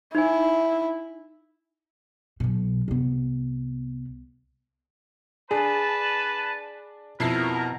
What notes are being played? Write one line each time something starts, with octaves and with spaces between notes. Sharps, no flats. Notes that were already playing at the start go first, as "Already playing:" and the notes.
D#4 E4 G#5
B1 B2
C2 B3
D4 G#4 B4 A5
F2 B2 E4 A#4 C7